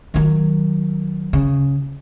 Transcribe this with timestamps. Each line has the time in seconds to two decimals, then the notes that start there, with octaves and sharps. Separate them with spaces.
0.14 D#3 F#3
1.33 C#3